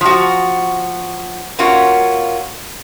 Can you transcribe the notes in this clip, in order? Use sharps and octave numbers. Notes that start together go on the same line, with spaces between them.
F3 F#4
A#3 C#4 F4 F#4